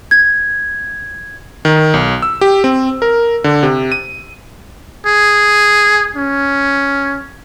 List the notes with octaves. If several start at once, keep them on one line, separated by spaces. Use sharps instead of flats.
G#6
D#3
B1
E6
G4
C4
A#4
D3
C3
D#7
G#4
C#4